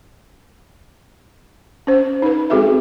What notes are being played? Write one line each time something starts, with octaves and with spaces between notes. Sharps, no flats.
C#4 C5
D#4 B4
G#3 C4 F#4 G#4 A4 E5